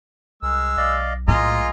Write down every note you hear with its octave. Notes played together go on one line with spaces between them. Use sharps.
C2 G#3 A#4 E6
B1 D5 D#5 F5
A2 G#3 A#3 F4 D#5 G#5 A#5